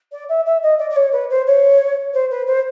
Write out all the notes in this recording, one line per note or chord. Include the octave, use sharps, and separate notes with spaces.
D5
E5
E5
D#5
D5
D5
C#5
B4
C5
C#5
C5
B4
C5